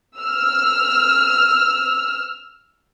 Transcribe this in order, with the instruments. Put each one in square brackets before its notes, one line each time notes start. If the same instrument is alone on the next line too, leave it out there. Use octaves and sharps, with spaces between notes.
[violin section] E6 F6